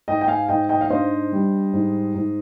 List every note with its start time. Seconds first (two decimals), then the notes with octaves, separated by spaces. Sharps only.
0.08 G#2 D#5 G5
0.21 G5
0.28 F5 G#5
0.48 G#2 D#5 G5
0.69 D#5 G5
0.81 F5
0.90 D4 C5 D#5
1.32 G3
1.73 G#2
2.15 G#2